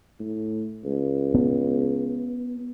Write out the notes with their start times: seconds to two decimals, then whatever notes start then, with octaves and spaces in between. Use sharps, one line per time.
0.20 A2
0.84 C#2
1.34 B3